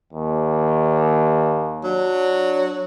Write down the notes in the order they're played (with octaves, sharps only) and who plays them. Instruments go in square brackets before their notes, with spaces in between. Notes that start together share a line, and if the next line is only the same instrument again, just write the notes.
[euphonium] D#2
[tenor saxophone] F#3 [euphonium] D4